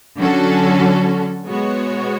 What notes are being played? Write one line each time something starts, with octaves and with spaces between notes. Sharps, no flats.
D3 F#3 C#4 F#4 A4
B2 G#3 B3 F#4 C#5